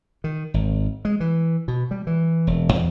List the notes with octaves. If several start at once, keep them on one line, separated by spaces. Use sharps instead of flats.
D#3
G#1
G#3
E3
B2
G3
E3
E1
E2